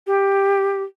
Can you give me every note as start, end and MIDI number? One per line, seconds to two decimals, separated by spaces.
0.07 0.83 67